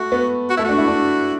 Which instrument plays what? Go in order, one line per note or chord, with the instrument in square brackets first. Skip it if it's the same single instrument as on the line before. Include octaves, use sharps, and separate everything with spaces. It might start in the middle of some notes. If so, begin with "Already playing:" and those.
Already playing: [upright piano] A3 [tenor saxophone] F#4
[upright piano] B3
[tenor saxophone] F#4
[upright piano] A3 [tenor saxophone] E4
[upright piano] D4 [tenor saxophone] F#4
[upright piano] E4
D4